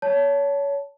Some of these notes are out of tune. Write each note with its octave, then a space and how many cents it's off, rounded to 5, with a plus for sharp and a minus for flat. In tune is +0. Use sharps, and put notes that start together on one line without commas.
C#5 +25 A5 +0